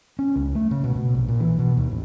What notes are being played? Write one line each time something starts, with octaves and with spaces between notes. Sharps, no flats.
C#4
C#2
A3
C#3
B2
B2
A#1
A#2
E3
B2
D#2
A1